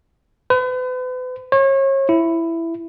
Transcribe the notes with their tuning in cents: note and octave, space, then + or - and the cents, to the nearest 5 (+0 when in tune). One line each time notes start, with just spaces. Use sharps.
B4 +40
C#5 -35
E4 +10